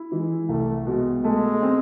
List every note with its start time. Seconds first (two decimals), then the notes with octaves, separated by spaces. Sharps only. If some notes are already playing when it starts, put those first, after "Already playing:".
Already playing: E4
0.12 E3 G#3
0.49 C2 A3
0.87 B2 G#3
1.24 G#3 A3
1.62 C4